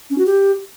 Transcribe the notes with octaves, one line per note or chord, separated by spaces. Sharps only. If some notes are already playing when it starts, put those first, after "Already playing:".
C#4
F#4
G4